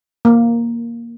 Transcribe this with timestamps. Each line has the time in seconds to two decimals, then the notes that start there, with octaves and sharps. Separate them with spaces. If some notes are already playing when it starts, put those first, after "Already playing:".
0.25 A#3